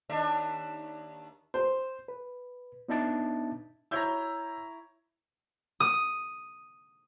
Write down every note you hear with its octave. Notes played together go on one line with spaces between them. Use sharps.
D#2 D4 E5
C5
B4
B3 D4 D#4 E5 A5 A6
E4 C#5 A#5 E6 G6 G#6
D#6